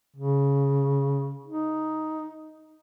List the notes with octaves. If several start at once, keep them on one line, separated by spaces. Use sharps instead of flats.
C#3
D#4